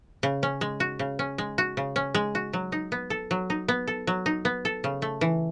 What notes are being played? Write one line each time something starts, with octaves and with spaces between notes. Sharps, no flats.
C#3
C#4
G#3
F#4
C#3
C#4
G#3
F#4
C#3
C#4
G#3
F#4
F#3
D#4
B3
A4
F#3
D#4
B3
A4
F#3
D#4
B3
A4
C#3
A3
E3